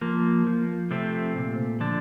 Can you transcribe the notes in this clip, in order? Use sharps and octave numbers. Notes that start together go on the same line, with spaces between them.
F3 A#3
F3
C3 A3 C4
A#2
D3 F3 D4